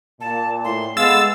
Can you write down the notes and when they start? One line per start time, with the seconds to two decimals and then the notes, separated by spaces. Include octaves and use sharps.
0.21 A#2 A5
0.64 A2 C6
0.97 G#3 A3 B3 F5 E6 A6